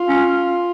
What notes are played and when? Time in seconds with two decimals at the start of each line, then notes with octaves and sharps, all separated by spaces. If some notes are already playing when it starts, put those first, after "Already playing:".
Already playing: F4
0.08 C#4